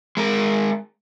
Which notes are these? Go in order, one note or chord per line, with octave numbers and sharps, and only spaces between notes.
G#3 A#4